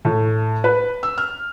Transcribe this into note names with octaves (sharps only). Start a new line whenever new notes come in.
A2
B4
E6
F6